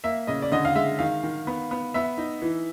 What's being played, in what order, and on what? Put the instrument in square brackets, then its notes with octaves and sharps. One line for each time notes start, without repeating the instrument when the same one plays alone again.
[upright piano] A#3 E5
C#3 D#5
D5
D3 D#5
F5
G#3 E5
D#3 F5
D#3
B3
B3
B3 E5
D#4
E3